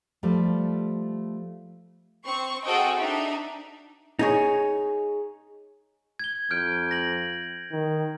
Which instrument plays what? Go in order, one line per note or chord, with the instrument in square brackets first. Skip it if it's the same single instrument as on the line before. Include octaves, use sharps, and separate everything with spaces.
[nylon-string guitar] F3 G3 A3
[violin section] C4 C#6
C4 F#4 G#4 A4 D#5 G5
D4 D#4 E5
[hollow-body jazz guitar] D#4 G#4 C#5
[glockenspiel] G#6 G7
[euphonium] F2 [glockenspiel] F6 G6 D7
[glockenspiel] A#6 F#7
[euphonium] D#3